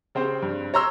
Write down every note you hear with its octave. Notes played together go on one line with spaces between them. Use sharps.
C#3 C4 G4 C5
G2
C#5 A#5 C6 E6